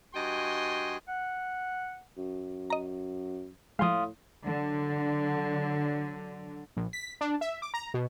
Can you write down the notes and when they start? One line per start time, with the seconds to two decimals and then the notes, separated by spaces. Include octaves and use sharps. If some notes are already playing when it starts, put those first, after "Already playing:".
0.14 G2 F#4 D#5 G5 G#5 C6
1.08 F#5
2.17 F#2
2.70 D#5 A#5
3.79 A2 F3 G#3 F5 C6 D#6
4.46 D3 F#3
6.77 A#1
6.93 B6
7.21 D4
7.41 E5
7.62 D6
7.74 A#5
7.94 B2